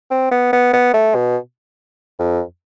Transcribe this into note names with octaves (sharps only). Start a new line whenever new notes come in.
C4
B3
B3
B3
A3
B2
F2